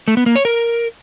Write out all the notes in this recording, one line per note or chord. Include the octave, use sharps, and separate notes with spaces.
A3
B3
A#3
C#5
A#4